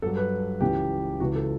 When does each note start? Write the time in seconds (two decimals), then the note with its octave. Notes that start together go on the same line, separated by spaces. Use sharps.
0.02 G2 F#3 A4
0.17 B4
0.61 C#2 C#3 E3 G4
1.20 C#2 C#3 E3 F#4
1.36 A4